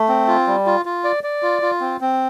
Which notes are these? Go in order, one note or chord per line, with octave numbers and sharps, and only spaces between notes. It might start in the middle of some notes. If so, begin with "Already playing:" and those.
Already playing: A3
C4
F4
G3
F4
F4
D5
D5
F4
F4
C4
C4